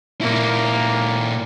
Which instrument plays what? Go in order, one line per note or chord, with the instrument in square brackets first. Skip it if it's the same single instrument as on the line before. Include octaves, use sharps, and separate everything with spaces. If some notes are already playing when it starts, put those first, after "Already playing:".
[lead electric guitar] A#2 E4 [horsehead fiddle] A#3